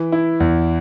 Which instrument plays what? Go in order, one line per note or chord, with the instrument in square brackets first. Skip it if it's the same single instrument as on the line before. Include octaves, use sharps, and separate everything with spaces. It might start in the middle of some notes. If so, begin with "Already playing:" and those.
Already playing: [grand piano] E3
E4
E2